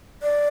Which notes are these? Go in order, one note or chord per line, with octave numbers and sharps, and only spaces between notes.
D5